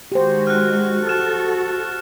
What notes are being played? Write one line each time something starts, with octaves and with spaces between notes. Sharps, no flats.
D#3 G#3 F#4 G4 C5
F6 F#6
F#4 A4 F6 E7